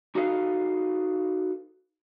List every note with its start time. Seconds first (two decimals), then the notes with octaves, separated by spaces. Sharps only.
0.15 D#4 F#4 G#4 A4 B4 F5